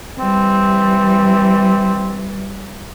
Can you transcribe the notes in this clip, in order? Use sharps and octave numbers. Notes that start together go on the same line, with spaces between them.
E3 G3 C4